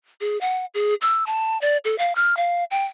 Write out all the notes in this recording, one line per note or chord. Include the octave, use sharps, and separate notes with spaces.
G#4
F#5
G#4
E6
A5
D5
A4
F5
F6
F5
G5